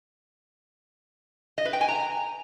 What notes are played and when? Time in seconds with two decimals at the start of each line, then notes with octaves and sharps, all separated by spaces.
1.58 D#5
1.65 B4
1.73 G5
1.81 G#5
1.88 A#5